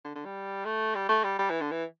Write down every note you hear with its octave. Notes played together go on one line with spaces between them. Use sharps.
D3
D3
G3
A3
G3
A3
G3
G3
E3
D3
E3